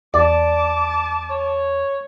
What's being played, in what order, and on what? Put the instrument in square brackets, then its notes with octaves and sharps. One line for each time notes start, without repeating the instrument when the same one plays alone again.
[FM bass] E2 [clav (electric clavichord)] D5 [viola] A5 D6
[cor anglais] C#5